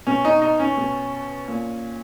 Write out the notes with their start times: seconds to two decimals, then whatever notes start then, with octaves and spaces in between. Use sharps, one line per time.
0.07 B2 C#4
0.25 D#4
0.42 D#4
0.59 C#4
0.77 B2
1.48 A#2